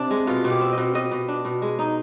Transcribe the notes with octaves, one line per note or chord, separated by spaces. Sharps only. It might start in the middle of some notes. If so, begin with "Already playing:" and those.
Already playing: C3 D4
G#3
B2 F4
B2
G4
C4
D#5
B2
B2 D#5
B2
D4
B2
G#3
D#4